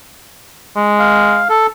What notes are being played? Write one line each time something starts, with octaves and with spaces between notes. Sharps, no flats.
G#3
F5
A4